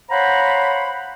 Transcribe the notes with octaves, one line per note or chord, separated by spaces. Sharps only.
C5 C#5 F5 F#5 A#5 B5